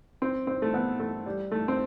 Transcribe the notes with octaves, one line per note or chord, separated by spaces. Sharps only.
C4
C4
A3
B3
A3
G3
A3
C4